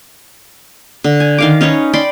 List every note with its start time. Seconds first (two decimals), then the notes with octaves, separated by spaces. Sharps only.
1.04 D3
1.20 G#5
1.38 D#3 F5 D6
1.61 C#4 D#4 B4 C#5
1.93 D5 G5 B5 C6